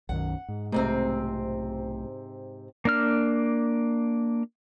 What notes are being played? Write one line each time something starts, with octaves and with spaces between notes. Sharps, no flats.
B1 F#2 D#3 F#5
G#2
B1 G#2 C3 A3 C4
A#3 D4 F6